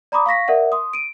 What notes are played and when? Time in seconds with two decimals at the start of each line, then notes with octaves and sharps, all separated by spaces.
0.12 D5 A#5 B5 D6 D#6
0.26 F5 C#6 A#6 B6
0.48 A#4 D5 E5 F#5
0.72 C6 D#6
0.93 D7 D#7